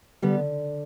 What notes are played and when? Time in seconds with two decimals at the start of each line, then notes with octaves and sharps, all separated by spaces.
0.22 D3 G3 B3